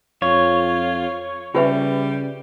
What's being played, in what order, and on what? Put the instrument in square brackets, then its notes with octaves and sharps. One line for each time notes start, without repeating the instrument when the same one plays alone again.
[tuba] F2 [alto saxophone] F4 [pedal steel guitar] C#5
[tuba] C#3 [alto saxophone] G3 [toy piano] F4 B4 E5